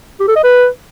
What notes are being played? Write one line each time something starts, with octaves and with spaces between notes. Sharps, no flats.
G4
A4
D#5
B4